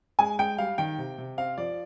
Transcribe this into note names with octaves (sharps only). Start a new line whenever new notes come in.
G#3 G#5
G#3 G5
G3 F5
D#3 G5
C3
C3
C4 F5
F3 D5